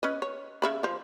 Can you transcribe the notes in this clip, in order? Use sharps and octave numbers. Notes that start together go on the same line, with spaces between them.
C#4 B4 D#5
C#5
C#3 E5 B5
F3 C5